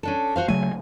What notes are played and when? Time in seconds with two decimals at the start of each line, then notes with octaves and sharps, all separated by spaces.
0.03 C#4 D4 A4
0.36 F#4 C5 F5
0.48 C#3 F#3 A3 G#5